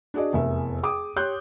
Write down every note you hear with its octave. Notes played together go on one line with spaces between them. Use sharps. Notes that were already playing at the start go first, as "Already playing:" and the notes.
D4 F#4 G#4 D5 D#5
F1 E2 A#4 E5
G#4 G5 D6 D#6
G4 C#5 C6 F#6 G6